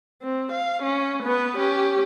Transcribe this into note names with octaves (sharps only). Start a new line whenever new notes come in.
C4
F5
C#4
B3 B4
C#4 G4